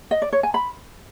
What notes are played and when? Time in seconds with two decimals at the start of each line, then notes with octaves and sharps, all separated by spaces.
0.11 D#5
0.22 D5
0.33 C#5
0.43 G#5
0.54 B5